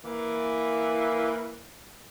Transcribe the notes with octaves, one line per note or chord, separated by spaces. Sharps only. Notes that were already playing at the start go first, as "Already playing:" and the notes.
E3 A#3